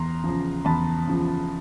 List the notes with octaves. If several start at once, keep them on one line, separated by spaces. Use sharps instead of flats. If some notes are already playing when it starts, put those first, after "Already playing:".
Already playing: E2 A#5 C6
C#3 F3
E2 A5 B5
C#3 F3